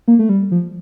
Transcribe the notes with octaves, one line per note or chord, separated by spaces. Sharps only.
A#3
A3
G3
F3